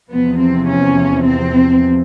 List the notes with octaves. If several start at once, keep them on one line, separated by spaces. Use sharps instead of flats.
E2 C3 F3 B3
C4
C#4
C4